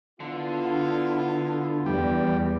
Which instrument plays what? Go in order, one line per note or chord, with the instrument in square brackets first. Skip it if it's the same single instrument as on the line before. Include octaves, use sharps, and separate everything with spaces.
[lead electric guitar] D3 [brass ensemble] B3 E4 F4
[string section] E2 [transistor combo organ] G3